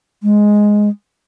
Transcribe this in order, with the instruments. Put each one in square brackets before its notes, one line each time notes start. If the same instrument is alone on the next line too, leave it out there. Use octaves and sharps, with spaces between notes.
[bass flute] G#3